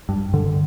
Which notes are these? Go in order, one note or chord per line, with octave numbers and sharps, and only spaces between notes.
G2
D3